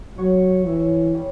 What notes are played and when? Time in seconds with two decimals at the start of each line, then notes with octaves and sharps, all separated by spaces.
0.18 F#3 B3 F#4 C#5
0.66 E3 E4 G4 C#5 E5
1.15 G3 C#4 G4